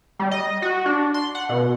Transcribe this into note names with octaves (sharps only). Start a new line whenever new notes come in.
G3
D#5
F#4
D4
C6
F#5
B2